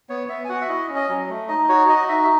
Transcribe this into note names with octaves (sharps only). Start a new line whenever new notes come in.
B3 C#5
B3 E5
G#5
F#4 F#5
E5
E4 D#5
C#4
D#5
F#3
A3
D#4 D#5
F#4 C#5
F#4 D#5
D#4 E5
E5